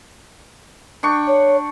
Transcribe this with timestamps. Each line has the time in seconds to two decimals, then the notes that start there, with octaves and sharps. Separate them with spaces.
1.03 D4 G5 C#6
1.28 C#5